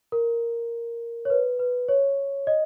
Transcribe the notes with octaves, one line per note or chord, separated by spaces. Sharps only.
A#4
C#5
B4
B4
C#5
D#5